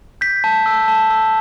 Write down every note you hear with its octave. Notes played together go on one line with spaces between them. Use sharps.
G6 B6
A5
E6
A5
E6